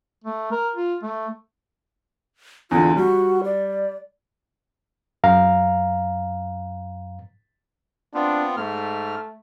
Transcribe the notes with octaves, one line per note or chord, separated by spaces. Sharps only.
A3
A#4
F4
A3
E2 D3 F4
G3 F#4
D5
F#2 F5 A#5
B3 C4 D4 F4
G#2 A3 F6